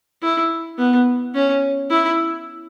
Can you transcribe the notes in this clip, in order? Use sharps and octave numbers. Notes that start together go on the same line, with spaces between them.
E4
B3
C#4
E4